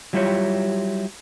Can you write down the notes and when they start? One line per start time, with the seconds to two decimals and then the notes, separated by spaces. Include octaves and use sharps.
0.13 F#3 G3 E4 F4 G4 C#5